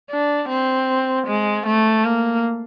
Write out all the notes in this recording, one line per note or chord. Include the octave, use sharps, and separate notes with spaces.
D4
C4
G#3
A3
A#3